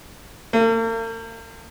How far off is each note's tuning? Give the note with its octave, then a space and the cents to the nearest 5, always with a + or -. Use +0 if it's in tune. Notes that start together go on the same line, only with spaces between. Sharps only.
A#3 -45